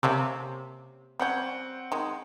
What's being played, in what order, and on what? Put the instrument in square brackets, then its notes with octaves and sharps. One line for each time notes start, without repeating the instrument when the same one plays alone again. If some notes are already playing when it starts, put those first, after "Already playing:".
[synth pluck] C3 [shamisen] A#3 C#4 A4
[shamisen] G3 C#4 [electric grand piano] C4 F#5 G6
[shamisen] D#3 G#3